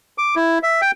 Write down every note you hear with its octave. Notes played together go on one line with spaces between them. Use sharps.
D6
E4
E5
G5